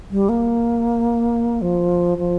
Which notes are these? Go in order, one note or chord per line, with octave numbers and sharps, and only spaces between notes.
G3
A#3
F3
F3